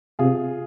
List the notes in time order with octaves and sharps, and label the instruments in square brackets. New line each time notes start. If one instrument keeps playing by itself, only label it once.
[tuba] C3 [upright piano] F4 G#4